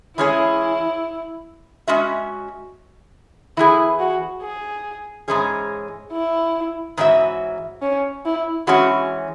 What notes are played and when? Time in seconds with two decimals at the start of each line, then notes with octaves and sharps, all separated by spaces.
0.18 E3 G#3 C#4 E4 G#4 C#5
1.88 G#3 C#4 F#4 E5
3.57 E3 B3 E4 G#4
4.00 F#4
4.43 G#4
5.28 G#2 E3 G#3 C#4 G#4
6.12 E4
6.97 G#2 E3 C#4 F#4 E5
7.82 C#4
8.25 E4
8.67 E3 G#3 C#4 F#4